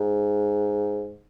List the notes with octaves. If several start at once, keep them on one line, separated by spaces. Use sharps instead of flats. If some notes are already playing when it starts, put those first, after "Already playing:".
Already playing: G#2